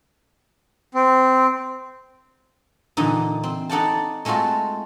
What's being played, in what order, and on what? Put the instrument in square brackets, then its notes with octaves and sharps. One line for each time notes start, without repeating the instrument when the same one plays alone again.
[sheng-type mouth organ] C4
[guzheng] A#2 D3 E3 D#4
C4
D#4 A4 D5 F#5 G5 A5
G#3 A3 C4 F4 F#4 A4